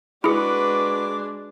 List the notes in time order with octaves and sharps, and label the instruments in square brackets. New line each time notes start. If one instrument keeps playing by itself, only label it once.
[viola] G#3 D4 [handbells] E4 G#4 [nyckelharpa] F#4 B4 [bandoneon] D6